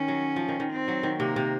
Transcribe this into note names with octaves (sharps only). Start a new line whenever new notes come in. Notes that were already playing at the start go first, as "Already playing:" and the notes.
Already playing: D#3 C#4
F#3
F3
D#3
D#3
C4
F#3
D#3
C3 A#3
C3